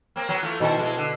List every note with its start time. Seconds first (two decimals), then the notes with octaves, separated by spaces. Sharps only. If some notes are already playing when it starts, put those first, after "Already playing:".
0.16 A#3 C4
0.29 F#3 B3 C#4
0.42 E3 A3 F4
0.60 B2 D#3 E4 A4 C5
0.77 F2 G#3 E4
0.97 D3